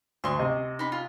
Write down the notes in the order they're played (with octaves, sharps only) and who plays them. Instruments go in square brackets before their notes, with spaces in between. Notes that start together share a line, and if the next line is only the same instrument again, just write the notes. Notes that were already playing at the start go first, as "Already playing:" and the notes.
[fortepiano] D2 [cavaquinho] C6 C#6
[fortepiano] C3 D#5
[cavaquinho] D#4 B5
F4